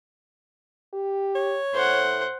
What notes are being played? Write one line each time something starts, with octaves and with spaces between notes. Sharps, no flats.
G4
C#5
A2 C5 F#5